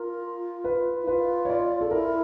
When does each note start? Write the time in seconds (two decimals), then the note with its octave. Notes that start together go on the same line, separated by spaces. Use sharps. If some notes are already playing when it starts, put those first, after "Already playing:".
Already playing: F4 A#4
0.64 B4
1.02 E4
1.07 F4 B4
1.45 C#5
1.50 D5
1.81 A4
1.91 E4 A#4